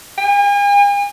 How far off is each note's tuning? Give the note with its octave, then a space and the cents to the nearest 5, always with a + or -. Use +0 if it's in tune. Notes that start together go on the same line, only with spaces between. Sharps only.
G#5 -45